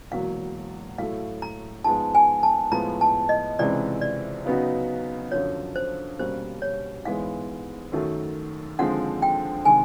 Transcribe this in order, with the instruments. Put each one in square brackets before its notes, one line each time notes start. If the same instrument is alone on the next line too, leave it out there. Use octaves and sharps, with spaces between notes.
[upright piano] E1 E2 B2 F#3 A#3 [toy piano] F5
[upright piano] A2 F#3 A3 [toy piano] F5
[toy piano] A#5
[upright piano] G#2 F3 G#3 B3 [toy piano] A5
[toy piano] G#5
A5
[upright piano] A2 F3 G#3 B3 [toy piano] A#5
[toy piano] A5
D#5
[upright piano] C#2 C3 E3 G#3 C#4 [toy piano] D5
[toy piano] D5
[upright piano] C#3 F#3 B3 D#4 F#4
[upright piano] F#2 D3 F3 [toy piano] C#5
[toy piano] C5
[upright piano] B2 G3 A#3 C#4 [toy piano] C5
[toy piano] C#5
[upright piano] G#2 E3 G#3 B3 [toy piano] F5
[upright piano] F#2 D#3 F#3 A3
[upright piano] D#2 D3 F3 G#3 C4 [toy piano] F#5
[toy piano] G5
[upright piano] C3 D#3 G#3 [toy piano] G#5